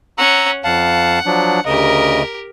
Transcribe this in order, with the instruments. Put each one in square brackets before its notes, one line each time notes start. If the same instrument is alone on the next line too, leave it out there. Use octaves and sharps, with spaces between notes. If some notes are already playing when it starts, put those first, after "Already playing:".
[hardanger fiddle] C#4 F#5 [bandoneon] A#5 E6
[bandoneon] F2 F5 A5 [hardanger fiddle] F#5
[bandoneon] F3 F#3 D4
[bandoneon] D2 C#3 D#5 [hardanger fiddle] G4 A#4